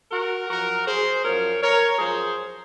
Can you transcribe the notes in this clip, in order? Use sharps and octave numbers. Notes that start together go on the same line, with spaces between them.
F#4 A#4
F#2 F3 F#4 A#4
G#4 C5
F#2 F3 A#4 C#5
A#4 C#5
F#2 F3 G#4 C5